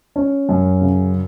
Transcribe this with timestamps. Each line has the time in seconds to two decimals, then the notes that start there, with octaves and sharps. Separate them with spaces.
0.16 C#4
0.49 F#2
0.81 C#3